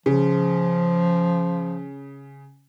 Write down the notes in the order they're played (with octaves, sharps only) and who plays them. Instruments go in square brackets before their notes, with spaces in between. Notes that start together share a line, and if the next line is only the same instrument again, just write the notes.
[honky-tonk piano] C#3 [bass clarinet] F3